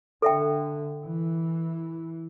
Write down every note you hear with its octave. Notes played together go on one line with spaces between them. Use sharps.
D3 A4 E5 G5
E3